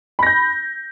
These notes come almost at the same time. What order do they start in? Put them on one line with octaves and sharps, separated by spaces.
B5 A#6 G6